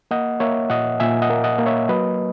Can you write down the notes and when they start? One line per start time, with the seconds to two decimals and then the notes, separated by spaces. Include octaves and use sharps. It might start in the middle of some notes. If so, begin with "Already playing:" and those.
0.11 A#3 D#5 F#5
0.40 A#3 C#5 E5
0.70 A#2 D#5 F#5
1.00 A#2 E5 G#5
1.22 D#5 F#5
1.30 A#3
1.44 D#5 F#5
1.59 A#3
1.66 C#5 E5
1.89 F#3 B4 D#5